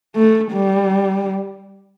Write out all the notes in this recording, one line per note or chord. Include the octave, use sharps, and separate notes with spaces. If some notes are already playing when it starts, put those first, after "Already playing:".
A3
G3